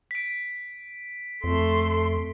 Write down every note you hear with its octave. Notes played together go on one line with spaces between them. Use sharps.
B6 D7
F2 A3 C6